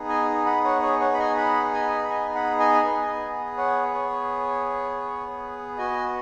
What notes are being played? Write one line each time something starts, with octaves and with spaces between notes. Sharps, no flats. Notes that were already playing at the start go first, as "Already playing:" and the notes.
Already playing: B3 D#4 G#4
D#5 G#5
F#5 B5
C#5 F#5
C#5
C#5 F#5
B5
D#5 G#5
F#5 B5
D#5 G#5
B5
D#5 G#5
F#5 B5
D#5 G#5
B3 G#4
C#5 F#5
C#5
B3 F#4 D#5 G#5